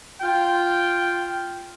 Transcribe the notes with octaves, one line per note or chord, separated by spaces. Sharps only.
F4 G5